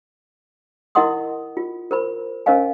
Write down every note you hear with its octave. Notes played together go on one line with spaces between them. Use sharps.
E4 A#4 D#5 F#5 C6 D#6
F4
A#4 C5 B5
C#4 A#4 C5 D#5 F5 G#5